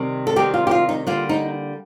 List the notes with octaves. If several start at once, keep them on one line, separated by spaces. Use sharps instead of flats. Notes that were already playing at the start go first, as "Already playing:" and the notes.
Already playing: C3 D#3 G3 C4
A4
C3 D#3 G3 C4 G4
F4
G4
F4
D#4
D3 G3 A#3 F4
D#4